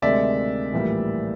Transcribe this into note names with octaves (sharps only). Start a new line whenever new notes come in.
D2 C3 D#3 G#3 D5 E5
A#1 A2 E3 G3 A#3